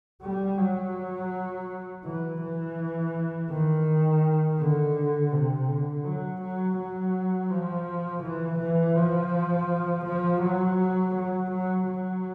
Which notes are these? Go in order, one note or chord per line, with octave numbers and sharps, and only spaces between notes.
G3
F#3
E3
E3
D#3
D3
C3
D3
F#3
F#3
F#3
F3
E3
E3
F3
F3
F#3
F#3
F#3
F#3